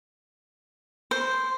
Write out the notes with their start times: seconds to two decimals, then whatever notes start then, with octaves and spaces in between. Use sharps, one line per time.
1.11 C5